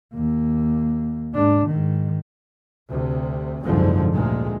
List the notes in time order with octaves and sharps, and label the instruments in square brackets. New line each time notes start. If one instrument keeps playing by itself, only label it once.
[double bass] D#2 A#3
G#2 D4
G#2 D#3
[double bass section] D2 C3
F#1 C2 G#2 D3 F3
D2 A#2 G#3